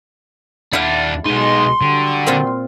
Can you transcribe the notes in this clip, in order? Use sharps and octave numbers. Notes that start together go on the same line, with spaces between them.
D#2 D4 E4 F5 F#5
B1 B2 G#3 D#4 C6
D3 F#3 G3 G4
A#2 C4 F4